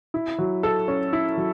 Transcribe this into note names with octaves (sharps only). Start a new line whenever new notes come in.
E4
F#3
A4
C#4
E4
F#3